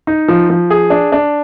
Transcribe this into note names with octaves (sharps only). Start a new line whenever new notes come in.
D#4
F3
F3
G#4
D4
D4